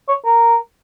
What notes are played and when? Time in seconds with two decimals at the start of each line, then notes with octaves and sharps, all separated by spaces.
0.09 C#5
0.25 A#4